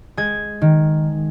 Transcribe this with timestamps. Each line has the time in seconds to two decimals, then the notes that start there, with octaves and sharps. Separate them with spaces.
0.17 G#3 G#6
0.61 D#3